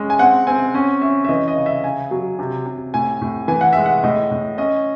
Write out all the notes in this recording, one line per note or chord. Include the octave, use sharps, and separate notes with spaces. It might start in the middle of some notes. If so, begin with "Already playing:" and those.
Already playing: G#3 C#4
G#5
C4 F#5
C4 G#5
C#4 G#5
C#4 E5
E5
E3 D#5
D#5
C#3
E5
C#3 G#5
F#3
C3
C3
A2 G#5
A2
E3 G#5
F#5
G#3 E5
F#5
A2 D#5
A2
C#4 D#5